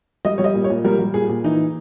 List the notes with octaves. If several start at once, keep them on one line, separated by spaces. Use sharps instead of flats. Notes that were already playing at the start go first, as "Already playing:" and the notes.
G3 D#5
G3 C#5
D#5
A#2
C#5
A#2
G3 A#4
G3
A#2 G#4
A#2
E3 D#4